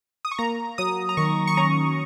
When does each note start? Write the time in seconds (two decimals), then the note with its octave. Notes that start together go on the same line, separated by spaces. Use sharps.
0.25 D#6
0.31 C#6
0.38 A#3 A#5
0.78 F#3 D#6
1.09 A#5
1.17 D#3 C#6
1.47 C#6
1.57 C#4 A#5